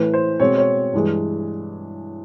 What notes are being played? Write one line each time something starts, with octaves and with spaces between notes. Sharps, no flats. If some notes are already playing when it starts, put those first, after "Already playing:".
Already playing: A2 E3 A3 B4
C5
B2 G#3 C4 C#5
C#5
G2 E3 G#3